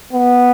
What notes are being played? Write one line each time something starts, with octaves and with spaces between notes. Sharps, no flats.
B3